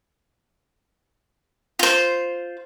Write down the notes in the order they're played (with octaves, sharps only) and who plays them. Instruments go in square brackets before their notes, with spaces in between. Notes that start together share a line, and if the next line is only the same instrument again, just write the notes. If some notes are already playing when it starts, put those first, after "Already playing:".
[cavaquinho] F4 C5